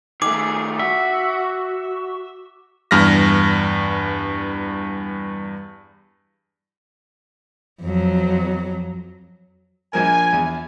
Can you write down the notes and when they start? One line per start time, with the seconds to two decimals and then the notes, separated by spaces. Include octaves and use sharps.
0.22 D#3 A3 G#4 D6
0.79 F#4 E5
2.91 E2 G2 F6 A#6
7.82 F2 F#3
9.93 A#1 F3 A#4 G#5
10.33 E2